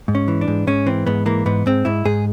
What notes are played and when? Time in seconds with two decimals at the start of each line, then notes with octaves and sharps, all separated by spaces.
0.08 G#2
0.15 C#4
0.28 E3
0.41 D4
0.48 G#2
0.67 G#2 C#4
0.86 E3 C4
1.06 G#2 B3
1.26 E3 A#3
1.46 G#2 B3
1.66 G#2 C4
1.85 G#2 E4
2.05 G#2 G#4